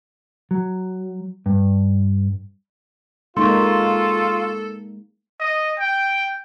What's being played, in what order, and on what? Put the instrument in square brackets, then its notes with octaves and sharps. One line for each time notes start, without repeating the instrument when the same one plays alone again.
[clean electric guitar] F#3
G2
[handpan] G#3 A#3 D#4 [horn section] F4 [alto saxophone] A4 [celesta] C6 C#6
[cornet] D#5
G5